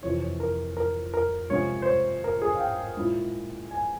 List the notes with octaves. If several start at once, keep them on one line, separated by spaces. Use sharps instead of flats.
F2 C3 E3 C#5
C#5
A#4
A#4
A#4
C3 F3 G#3 C#4 C#5
C5
C#5
A#4
G#4
F5
G5
A#2 G#3 C#4 E4
G#5